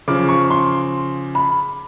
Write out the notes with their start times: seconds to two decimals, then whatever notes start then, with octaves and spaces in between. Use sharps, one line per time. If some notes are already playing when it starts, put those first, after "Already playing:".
0.08 C#3 F3 D6
0.29 C#6
0.50 C6
1.35 B5